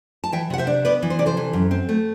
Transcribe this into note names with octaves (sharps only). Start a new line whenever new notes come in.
A5
E3 E5 G5
C3 F#5
C5 E5
D4
B3 B4 D5
E3
C5
C3 D5
A4 C5
E3
F#2
C4
A3